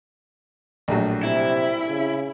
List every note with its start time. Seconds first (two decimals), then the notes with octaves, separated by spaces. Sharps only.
0.88 A#1 A2 F#3
1.23 C3 E4
1.89 C#3